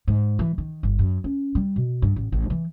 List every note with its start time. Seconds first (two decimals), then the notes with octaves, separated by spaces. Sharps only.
0.08 G#2
0.39 E3
0.58 D#3
0.83 G1
0.99 F#2
1.24 C#4
1.55 G3
1.76 B2
2.02 G2
2.16 A1
2.32 A1
2.50 E3